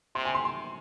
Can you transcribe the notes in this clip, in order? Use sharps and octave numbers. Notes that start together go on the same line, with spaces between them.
C3 C6
G#5
C6
C6